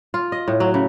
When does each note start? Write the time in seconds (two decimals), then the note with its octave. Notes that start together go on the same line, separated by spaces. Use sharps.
0.14 F4
0.32 D#5
0.48 A2
0.60 F#3
0.74 C#3